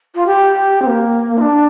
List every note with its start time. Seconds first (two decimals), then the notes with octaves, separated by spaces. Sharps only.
0.15 F4
0.27 G4
0.82 C4
0.87 A#3
1.38 F4
1.41 D4